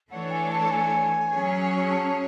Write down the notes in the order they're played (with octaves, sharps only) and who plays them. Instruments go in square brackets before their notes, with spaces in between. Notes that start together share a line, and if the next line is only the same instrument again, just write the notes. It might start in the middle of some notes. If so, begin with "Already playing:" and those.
[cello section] E3 A3 D4 A4 C#5 [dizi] F#5
[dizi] G#5
A5
G#5
[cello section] F#3 C#4 G#4 C#5
[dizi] A5